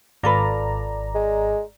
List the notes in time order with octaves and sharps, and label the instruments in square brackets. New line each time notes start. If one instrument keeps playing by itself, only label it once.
[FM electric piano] G#1 D5 A#5 [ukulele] F4 A4 B4
[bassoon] G#3